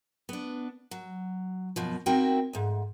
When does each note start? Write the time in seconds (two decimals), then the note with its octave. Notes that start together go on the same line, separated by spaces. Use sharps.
0.29 B3 D4
0.91 F#3
1.76 F#2 B2 F3
2.06 C4 D#4 E4 F#4 A#4 G5
2.53 D2 G#2